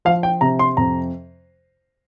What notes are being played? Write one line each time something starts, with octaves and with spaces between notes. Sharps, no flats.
F3 F5
G5
C3 A#5
C6
F2 A#5